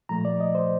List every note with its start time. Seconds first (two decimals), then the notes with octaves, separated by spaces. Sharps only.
0.09 A#2 F3 A3 A#5
0.25 D5
0.40 D#5
0.55 C5